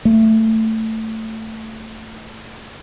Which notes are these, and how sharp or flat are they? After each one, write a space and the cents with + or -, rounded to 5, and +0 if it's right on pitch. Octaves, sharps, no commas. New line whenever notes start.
A3 +15